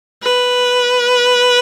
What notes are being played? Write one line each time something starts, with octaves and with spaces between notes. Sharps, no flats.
B4